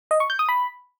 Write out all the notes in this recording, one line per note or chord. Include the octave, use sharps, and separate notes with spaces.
D#5
C#6
G6
D#6
B5